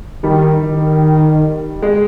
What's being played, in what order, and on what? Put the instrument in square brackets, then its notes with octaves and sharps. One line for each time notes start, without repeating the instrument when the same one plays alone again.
[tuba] D#3 [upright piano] G3
[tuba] D#3
[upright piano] G#3